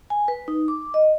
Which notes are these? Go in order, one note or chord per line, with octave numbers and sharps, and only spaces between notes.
G#5
B4
D#4
D6
D#5